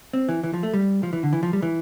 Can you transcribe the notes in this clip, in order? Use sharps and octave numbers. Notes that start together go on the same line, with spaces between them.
C4
E3
E3
F3
A3
G3
F3
E3
D3
E3
F3
G3
E3